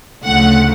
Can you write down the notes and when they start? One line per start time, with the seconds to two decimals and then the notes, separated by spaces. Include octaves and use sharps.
0.24 D2 C#3 F3 A3 F#5